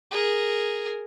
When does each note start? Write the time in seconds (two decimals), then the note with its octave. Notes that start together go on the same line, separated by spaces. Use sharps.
0.11 G#4 A#4